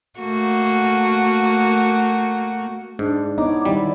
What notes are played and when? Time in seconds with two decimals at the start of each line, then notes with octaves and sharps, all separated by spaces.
0.20 A3 A#3 F#4
2.99 G#2 D4
3.38 B3 D#4 E4 C#5 D6
3.65 D#3 G3 C4 E4 D5